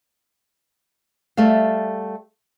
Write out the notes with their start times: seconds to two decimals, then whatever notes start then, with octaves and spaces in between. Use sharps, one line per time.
1.37 G3 A3 E5 F5